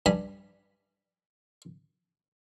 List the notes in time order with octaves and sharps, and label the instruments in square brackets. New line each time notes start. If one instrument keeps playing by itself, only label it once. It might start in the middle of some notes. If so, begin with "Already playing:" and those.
[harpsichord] G2 G#5 B5